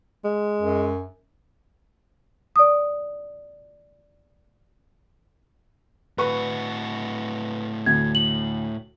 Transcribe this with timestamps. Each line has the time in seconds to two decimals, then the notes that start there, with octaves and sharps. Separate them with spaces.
0.24 G#3
0.62 F#2
2.56 D5 D#6
6.18 A2 F#4 B4 C#6
7.86 D2 G#6
8.15 F#7